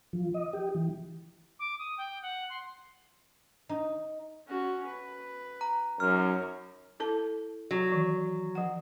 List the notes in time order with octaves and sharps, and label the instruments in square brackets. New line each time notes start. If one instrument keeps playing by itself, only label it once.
[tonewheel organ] F3
D#5
G4
E3
[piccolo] D6
D#6
G5
F#5
C6
[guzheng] D#4
[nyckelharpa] C#4 F#4
B4
[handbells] A#5
[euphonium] F#2 [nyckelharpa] D#4 C#5 [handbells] F6
[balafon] E4 A4 A5
[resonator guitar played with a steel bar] F#3
[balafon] D#3 E3
F3 F#5